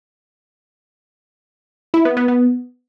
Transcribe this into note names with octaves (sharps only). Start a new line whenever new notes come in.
E4
B3
B3
B3